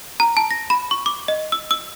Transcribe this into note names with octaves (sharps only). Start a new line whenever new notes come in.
A#5
A5
A#6
B5
C#6
D6
D#5
E6
E6